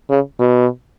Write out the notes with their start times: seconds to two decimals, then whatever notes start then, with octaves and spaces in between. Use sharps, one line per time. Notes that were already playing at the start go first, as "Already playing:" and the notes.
0.10 C#3
0.40 B2